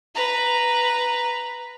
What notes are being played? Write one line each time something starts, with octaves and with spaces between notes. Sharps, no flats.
B4 A#5